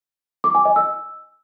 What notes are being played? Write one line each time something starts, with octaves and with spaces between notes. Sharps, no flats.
D6
G#5
D#5
E6